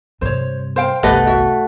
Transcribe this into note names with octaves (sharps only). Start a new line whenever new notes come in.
G2 C3 C5 C#5
C5 F5 G5
G1 C2 A3 G4 B4 D#5 F#5
F#4 E5